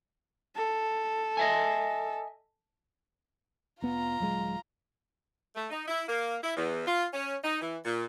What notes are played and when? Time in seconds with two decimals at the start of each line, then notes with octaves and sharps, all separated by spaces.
0.55 A4
1.37 D#5 E5 G#5
3.82 F1 B3 F4 A#5
4.20 D#1 F#3 G#3
5.55 A3
5.70 D#4
5.88 E4
6.08 A#3
6.42 E4
6.57 E2
6.87 F4
7.13 C#4
7.44 D#4
7.62 E3
7.85 A#2